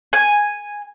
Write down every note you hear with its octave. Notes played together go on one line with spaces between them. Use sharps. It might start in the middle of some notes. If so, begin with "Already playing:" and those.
G#5